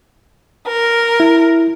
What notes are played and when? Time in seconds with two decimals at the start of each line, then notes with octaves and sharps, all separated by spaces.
0.67 A#4
1.20 E4